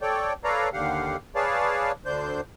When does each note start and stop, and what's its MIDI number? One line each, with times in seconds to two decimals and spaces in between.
0.01 0.33 69
0.01 0.33 73
0.01 0.33 74
0.01 0.33 79
0.44 0.69 69
0.44 0.69 71
0.44 0.69 73
0.44 0.69 74
0.44 0.69 77
0.44 0.69 82
0.73 1.16 39
0.73 1.16 50
0.73 1.16 67
0.73 1.16 77
0.73 1.16 78
1.35 1.92 68
1.35 1.92 71
1.35 1.92 73
1.35 1.92 74
1.35 1.92 77
1.35 1.92 81
2.06 2.41 38
2.06 2.41 50
2.06 2.41 62
2.06 2.41 72
2.06 2.41 91